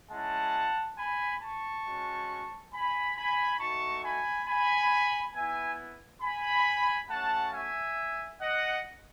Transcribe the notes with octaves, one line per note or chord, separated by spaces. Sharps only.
G#3 C#4 E4 F#5 A5
G#5 B5
A5 C#6
G#3 C#4 F#4
G#5 B5
G#5 B5
A3 D#4 F#4 A5 C#6
G#5 B5
G#5 B5
B3 E4 E5 G#5
G#5 B5
A3 C#4 F#4 F#5 A5
E5 G#5
D#5 F#5